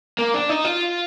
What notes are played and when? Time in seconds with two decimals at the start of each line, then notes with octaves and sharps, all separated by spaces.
0.19 A#3
0.34 D4
0.49 D#4
0.65 F4